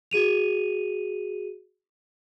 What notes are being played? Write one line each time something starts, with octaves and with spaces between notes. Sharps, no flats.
F#4 G#4 D#7 F7